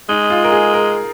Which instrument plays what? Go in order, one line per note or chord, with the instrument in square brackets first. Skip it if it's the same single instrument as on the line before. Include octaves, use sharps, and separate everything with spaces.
[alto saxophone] G#3 [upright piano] D#4
[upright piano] F4
A#4
G#4
A#4